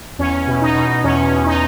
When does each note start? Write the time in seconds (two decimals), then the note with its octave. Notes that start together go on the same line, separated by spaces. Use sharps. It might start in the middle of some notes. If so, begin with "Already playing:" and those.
0.19 E2 C#4
0.47 B2
0.61 D#4
0.75 B2
1.04 E2 C#4
1.32 E2
1.46 D#4